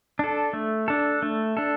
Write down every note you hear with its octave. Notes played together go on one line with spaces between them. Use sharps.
D4 A4
A3
D4 A4
A3
D4 A4